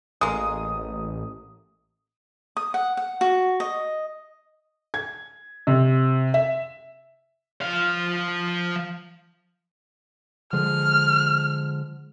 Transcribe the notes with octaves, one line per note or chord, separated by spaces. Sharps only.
A1 G#3 A#3 D#6
D#6
F#5
F#5
F#4
D#5
G#6
C3
E5
F3 F5
D3 F3 G#3 F6